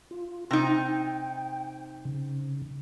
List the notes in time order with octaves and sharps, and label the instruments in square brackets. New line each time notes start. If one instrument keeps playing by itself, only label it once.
[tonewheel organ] F4
[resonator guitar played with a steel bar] C3 D#4 [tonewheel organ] G5
[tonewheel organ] C#3